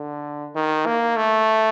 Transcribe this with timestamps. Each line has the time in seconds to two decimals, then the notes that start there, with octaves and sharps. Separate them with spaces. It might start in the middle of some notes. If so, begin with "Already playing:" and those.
Already playing: D3
0.55 D#3
0.86 A#3
1.16 A3